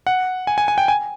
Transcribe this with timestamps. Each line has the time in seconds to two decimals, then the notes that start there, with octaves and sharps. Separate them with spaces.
0.07 F#5
0.47 G#5
0.58 G#5
0.68 G#5
0.78 G5
0.88 G#5